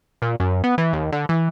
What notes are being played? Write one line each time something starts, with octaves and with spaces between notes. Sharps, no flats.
A#2
F#2
B3
E3
D#2
D3
E3